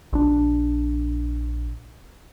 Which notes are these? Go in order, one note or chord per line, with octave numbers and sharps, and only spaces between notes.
A#1 D4